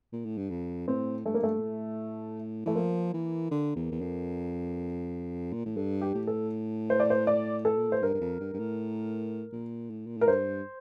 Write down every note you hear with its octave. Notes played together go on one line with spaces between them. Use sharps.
A#2
A2
G2
F2
A2 C4
G2 A3
A#3
A3
A#2
A2
E3 A3
F3 A#3
E3
D3
E2
E2
F2
A#2
A2
G2 A4
G4
A2
A4
C5
D5
C5
D5
A4
A#2
A2 C5
G2 A#4
G2
F2
G2
G2
A2
A#2
A2
A#2
A2 A#4
G2 C5